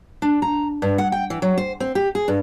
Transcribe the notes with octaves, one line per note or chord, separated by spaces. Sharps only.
D4
A#5
G2
F#5
G5
E3
F#3
C5
C4
G4
G#4
G2